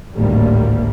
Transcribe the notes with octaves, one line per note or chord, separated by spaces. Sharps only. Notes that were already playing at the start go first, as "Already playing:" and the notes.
G#1 D2 A2 D3 G3 A#3